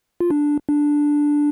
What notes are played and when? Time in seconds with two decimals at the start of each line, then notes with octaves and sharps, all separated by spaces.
0.20 F4
0.30 D4
0.69 D4